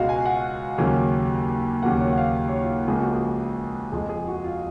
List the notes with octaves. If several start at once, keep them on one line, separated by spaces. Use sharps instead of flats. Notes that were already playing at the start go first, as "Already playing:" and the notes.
Already playing: C#2 B2 G#3 F#4 F5
G#5
F#5
D#2 C#3 F#3 A#3 G#5
D#2 C#3 F#3 A#3 F#5
C#5
F#5
F5
C#5
F4
C#2 C#3 F3 A#3 G#4
F#4
G#4
F2 F3 G#3 G#4
G#4
F#4
F4